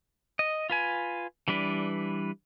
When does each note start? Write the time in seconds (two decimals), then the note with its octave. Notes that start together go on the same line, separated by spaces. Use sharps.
0.39 D#5
0.70 F4 B4 G#5
1.48 E3 G3 D4 B4